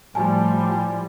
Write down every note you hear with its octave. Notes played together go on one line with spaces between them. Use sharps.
A2 F3 G3 G#5 A5
G#5